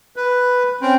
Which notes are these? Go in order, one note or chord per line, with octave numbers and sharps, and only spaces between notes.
B4
C4 C#4